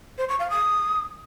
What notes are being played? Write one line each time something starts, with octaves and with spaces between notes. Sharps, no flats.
C5
C#6
F5
D#6